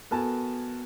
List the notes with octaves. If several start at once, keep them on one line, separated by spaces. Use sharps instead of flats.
B3 F#4 A4 A#4 G#5 A5